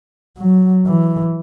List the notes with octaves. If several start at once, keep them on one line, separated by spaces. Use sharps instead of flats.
F#3
E3